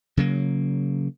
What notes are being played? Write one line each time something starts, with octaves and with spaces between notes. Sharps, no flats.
C#3 F#3 A#3